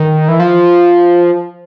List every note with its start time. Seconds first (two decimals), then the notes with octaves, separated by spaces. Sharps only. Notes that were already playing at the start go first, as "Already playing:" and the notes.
Already playing: D#3
0.28 E3
0.40 F3